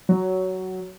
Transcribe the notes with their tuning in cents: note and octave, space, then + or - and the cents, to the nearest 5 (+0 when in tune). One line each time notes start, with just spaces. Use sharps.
F#3 +10